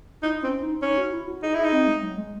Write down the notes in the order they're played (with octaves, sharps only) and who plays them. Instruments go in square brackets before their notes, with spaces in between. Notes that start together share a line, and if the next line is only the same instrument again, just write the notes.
[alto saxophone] D#4 [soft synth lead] E4
[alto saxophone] C4 [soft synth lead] C#4
[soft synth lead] D#4
[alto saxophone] C#4 [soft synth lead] D#4
[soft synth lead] F#4
E4
F#4
[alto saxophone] D#4 [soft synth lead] G#4
[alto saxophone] E4 [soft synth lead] G#4
[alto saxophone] D#4
[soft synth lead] C4
G#3
F#3
G#3